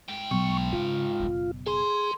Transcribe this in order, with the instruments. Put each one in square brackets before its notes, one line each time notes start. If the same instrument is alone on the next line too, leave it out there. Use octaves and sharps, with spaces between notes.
[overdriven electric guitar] G#2 G5
[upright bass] B1 [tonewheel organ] C#6
[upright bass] C#3 [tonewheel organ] F4
[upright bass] F#1 B2
[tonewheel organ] G#4 [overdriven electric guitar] A4 C6